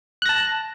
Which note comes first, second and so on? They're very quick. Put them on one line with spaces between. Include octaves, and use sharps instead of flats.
F#6 A#6 A5